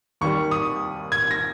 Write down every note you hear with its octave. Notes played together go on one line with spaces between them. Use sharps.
D#2 D#3 G3 C#6
D#6
G#6
A#6